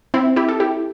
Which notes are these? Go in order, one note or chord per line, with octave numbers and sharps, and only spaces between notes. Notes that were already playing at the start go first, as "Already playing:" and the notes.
C4 E4
E4 G4
A4
E4 G4